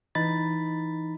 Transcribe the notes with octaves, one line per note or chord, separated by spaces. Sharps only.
E3 D#4 B5 A6